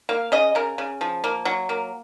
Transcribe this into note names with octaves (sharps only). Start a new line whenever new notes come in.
A#3 F5
C#3 D#5
C#3 A#4
C#3
F3
A#3
F#3
A#3